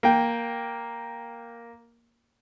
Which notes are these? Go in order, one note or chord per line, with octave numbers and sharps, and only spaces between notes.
A#3 G5